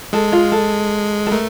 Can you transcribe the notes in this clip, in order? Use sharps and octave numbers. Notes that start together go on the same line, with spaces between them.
G#3 A4
F4
A4
A4
A3 A#4